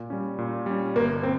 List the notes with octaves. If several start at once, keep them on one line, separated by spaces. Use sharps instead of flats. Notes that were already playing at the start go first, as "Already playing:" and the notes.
Already playing: A#2
G3 C#4
A#2
G3 C#4
G1 A#3
C4